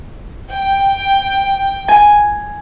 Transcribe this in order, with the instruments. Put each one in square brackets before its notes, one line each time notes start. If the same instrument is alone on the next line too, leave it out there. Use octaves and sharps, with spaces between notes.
[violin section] G5
[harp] G#5